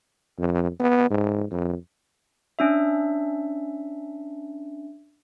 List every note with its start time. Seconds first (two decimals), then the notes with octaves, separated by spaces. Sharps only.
0.38 F2
0.80 B3
1.10 G#2
1.51 F2
2.59 C#4 D4 E5